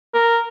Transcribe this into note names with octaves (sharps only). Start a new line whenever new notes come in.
A#4